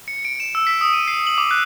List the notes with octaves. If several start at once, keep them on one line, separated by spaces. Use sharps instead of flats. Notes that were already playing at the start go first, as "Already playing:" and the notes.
C#7
D7
E7
E6
B6
D#6
D#7
C7
F#7
D6
F#6